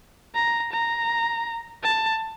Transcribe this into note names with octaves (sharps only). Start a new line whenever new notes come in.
A#5
A#5
A5